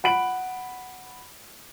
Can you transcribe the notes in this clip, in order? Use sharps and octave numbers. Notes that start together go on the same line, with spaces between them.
F#5 B5 D7 F#7